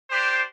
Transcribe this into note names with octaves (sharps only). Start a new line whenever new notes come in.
D4 G4 C5